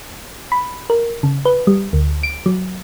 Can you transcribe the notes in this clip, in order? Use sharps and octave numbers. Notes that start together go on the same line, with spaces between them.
B5
A#4
C#3
B4
G3
D2
D7
F#3